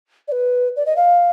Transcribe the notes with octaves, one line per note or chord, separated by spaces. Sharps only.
D5
B4
D5
D#5
F5